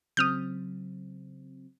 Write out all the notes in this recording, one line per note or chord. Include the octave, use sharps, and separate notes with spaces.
C#3 F#3 C4 D#6 F6 G6